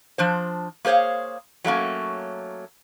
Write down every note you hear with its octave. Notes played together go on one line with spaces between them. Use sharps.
F3 D4 C5
A#3 G#4 C5 C#5 F5
F#3 A3 A#3 C#4